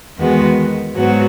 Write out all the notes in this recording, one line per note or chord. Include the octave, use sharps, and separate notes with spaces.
E2 D#3 G#3 B3 F#4
G#2 F#3 B3 F#4